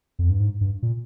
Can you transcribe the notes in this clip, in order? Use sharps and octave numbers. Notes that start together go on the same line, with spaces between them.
F2
G2
G#2
G2
A#2